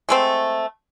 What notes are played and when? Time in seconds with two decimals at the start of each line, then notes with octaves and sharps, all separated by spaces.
0.09 G#3 A3 C4